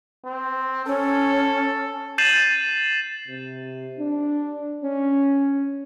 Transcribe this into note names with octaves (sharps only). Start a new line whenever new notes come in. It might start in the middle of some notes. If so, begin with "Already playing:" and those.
C4
C#4 A4
G6 A6 C7 D#7 E7 F#7
C3
D4
C#4